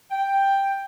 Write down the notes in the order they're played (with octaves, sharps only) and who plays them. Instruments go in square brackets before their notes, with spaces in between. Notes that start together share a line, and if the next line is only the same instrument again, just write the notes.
[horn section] G5